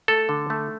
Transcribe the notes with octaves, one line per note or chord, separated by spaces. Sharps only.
A3 A4
D3
A3